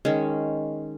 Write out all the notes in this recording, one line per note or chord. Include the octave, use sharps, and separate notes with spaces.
D#3 G#3 C#4